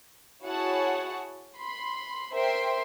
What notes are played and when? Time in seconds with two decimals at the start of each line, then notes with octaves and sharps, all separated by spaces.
0.43 E4 F#4 G#4 C#5 F#5 A5
1.56 B5 C6
2.33 A#4 C5 E5 G5 C6